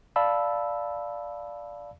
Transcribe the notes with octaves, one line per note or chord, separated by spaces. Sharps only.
D5 F5 A5 B5 E6